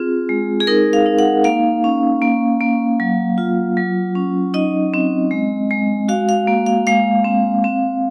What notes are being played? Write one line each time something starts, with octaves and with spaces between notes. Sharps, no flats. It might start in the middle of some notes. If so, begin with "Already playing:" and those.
Already playing: C4 F4 G#4
G#3
G#4
D#4 A#4
F5
D#4
F#5
A#3 F5
C#4
A#3
A#3
F#3
F4
F#3
C#4
D#4 D#5
C4
G#3
G#3
F#4 F5
F5
A#3
F5
G#3 F5
C4
C4